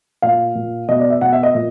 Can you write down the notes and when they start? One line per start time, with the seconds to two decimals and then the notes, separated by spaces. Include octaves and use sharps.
0.22 A#2 F5
0.55 A#2
0.89 B2 D#5
1.00 D5
1.10 E5
1.21 B2 F#5
1.33 E5
1.43 D#5
1.55 A#2